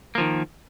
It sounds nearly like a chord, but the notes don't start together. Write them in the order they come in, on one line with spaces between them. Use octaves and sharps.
A#3 F3 D#3